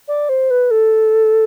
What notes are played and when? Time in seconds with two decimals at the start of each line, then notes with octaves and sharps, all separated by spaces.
0.08 D5
0.29 C5
0.50 B4
0.71 A4